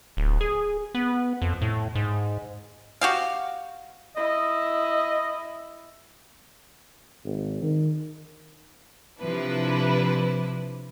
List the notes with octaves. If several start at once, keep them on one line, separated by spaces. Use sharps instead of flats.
D1
G#4
B3
F2
A2
G#2
F#4 G4 F5
E4 D#5
G#1
D#3
C3 F3 D4 E4 B4